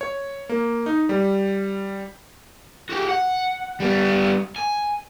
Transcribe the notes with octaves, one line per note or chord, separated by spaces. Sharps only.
C#5
A#3
D#4
G3
F#4 G4
F#5
G3 B3
G#5